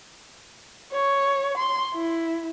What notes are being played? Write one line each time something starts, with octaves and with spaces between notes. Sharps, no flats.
C#5
C6
E4